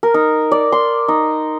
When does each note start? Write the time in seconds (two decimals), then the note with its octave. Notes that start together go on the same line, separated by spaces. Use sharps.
0.03 A#4
0.14 D#4
0.52 D5
0.72 C6
1.08 D#4